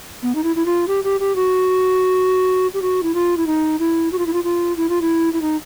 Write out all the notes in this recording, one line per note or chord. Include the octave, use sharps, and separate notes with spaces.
B3
D#4
E4
E4
F4
G4
G4
G4
F#4
G4
F#4
E4
F4
E4
D#4
E4
F#4
F4
E4
F4
F4
E4
F4
E4
E4
D#4